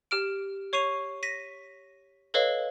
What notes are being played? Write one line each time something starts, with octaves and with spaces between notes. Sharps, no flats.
G4 F6 D7
C#5 C#6 C7 D#7 F7
A#6 B6 D#7
A4 B4 C#5 D#5 F5